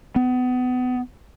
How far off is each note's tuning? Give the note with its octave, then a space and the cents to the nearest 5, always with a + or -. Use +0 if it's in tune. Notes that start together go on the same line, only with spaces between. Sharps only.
B3 +30